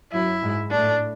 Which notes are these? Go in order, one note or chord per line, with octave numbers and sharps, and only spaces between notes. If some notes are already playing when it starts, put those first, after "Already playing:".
F#2 F#3 E4
G#2 G#3
A2 A3 D4